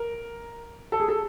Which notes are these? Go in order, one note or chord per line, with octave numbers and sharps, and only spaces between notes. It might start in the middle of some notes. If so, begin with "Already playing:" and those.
Already playing: A#4
A4
G#4
A4